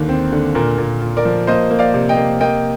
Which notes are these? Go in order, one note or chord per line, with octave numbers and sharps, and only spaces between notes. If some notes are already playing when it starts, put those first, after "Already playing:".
Already playing: D#2 D3 A#3
C4
D3
A#2 A#4
A#2
A#2
A#4 D5
F3
A#3 C5 D#5
A#3
D5 F5
C3
D#5 G5
A#3
A#3 D#5 G5